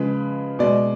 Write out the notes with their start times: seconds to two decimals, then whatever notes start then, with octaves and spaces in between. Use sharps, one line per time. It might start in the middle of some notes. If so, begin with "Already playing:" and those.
Already playing: C#3 F3 G#3 B4
0.59 B2 G#3 D5